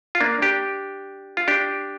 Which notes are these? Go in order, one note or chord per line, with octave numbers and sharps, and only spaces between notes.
F4
A#3 D4
D4 G4
F4
D4 G4